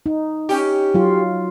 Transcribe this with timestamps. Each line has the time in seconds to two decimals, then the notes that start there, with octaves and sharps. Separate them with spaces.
0.06 D#4
0.49 C#4 G4
0.94 F#3 F4